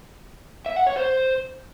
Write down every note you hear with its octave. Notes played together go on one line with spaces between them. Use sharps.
E5
F#5
C#5
C5